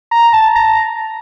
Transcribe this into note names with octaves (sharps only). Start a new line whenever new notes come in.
A#5
A5
A#5